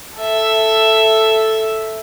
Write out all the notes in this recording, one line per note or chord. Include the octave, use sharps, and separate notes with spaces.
A4 E5